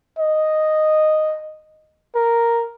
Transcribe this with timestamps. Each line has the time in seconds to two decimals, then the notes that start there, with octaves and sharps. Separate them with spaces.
0.19 D#5
2.15 A#4